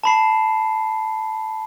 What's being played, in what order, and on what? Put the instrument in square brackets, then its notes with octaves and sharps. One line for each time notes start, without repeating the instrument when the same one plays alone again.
[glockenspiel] A5 B5 C7